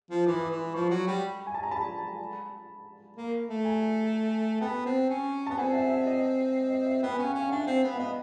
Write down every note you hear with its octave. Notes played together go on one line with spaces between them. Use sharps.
F3
E3 D6
D#6
C6 D6
E3
F3 B5 C#6
F#3
G3
G#5
A5
A#5
A5 B5
A#3
A3
G#5 A#5
B3 G5 A5
C4
C#4
B3 A5
C4 F#5 G#5
E5 F#5
E5
D#5
D#5
E5
B3 G5
C#4 G#5
F5 G5
C#4
F5
D4 E5 F#5
C4
B3
F#5
B3 D#5 F5